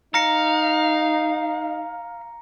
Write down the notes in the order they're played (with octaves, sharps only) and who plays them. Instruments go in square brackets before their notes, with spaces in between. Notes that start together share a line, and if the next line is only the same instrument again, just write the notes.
[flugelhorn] D#4 [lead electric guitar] F5 [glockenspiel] A#5 A#6 C#7